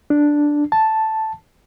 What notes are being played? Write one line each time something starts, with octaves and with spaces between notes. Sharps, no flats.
D4
A5